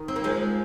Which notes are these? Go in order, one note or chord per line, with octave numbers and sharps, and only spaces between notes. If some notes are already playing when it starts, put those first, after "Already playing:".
Already playing: D#3
C4
A#3
F3 G#3